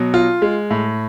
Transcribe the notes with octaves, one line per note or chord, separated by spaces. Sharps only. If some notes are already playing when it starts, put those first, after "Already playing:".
Already playing: B2 F#3
F4
G#3
A2